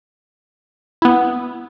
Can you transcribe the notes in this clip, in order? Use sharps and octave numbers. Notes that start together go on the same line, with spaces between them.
B3 E4